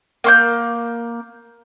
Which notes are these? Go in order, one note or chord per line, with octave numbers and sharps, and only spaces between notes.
A#3 C6 G6